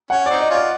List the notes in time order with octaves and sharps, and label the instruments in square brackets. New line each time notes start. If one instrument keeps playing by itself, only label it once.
[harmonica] C#4 [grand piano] F#5
[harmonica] C4 D#4 [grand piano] D5
[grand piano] D#5
[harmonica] C#4 F4 [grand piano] D5